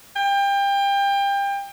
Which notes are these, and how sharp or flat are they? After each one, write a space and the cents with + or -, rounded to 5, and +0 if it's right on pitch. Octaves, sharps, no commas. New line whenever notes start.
G5 +25